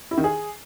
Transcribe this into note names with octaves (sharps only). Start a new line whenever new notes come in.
E4
D#3
G#4